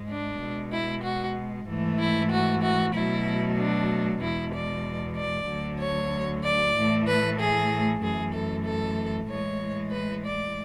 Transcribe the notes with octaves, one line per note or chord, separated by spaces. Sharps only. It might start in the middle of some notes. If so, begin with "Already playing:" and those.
Already playing: G#2 G#3
D4
B2 G#3
E4
F#4
G#2 E3 A3
E4
F#4
F#4
B2 F#3 A3 E4
D4
E2 B2 G#3 E4
D5
D5
D2 D3 F#3
C#5
D5
A2 E3 A3
B4
G#4
F#2 E3 A3 G#4
A4
A4
A2 E3 G#3 C#5
B4
D5